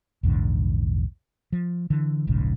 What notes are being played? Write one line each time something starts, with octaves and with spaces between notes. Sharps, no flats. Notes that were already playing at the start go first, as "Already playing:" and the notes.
A#1 E2 G#2 D3
F3
D3 E3
D#1 A#1 G#2 C#3